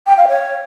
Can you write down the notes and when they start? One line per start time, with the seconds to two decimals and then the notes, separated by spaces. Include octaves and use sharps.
0.07 G5
0.17 F5
0.28 C#5